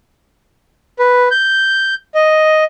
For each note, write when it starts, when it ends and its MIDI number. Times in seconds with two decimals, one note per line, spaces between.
0.99 1.29 71
1.31 1.94 91
2.15 2.64 75